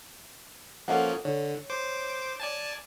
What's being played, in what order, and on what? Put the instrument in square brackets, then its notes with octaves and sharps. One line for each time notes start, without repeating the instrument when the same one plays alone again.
[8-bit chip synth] F3 A#3 C#4 [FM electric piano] A4 D#5 F#5
[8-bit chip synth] D3 [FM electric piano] C#5
[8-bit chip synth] C5 D6
D5 G#5 A5